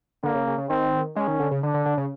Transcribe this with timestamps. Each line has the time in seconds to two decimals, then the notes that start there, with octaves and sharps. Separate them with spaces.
0.23 D3 A#3
0.35 C#3
0.47 C#3
0.58 C#3
0.69 D#3 C4
1.16 G#3 C#4
1.27 D#3
1.40 D3
1.51 C#3
1.63 D3 D4
1.74 D3
1.86 D3
1.97 C#3